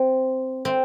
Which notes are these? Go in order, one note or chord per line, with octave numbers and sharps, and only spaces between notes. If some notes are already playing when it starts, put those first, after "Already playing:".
Already playing: C4
C4